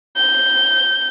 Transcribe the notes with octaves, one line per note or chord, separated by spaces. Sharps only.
G6